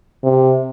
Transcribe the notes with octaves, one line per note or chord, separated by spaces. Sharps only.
C3